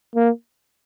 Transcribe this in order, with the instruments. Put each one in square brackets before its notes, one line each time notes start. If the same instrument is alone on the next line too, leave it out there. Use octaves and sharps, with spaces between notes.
[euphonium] A#3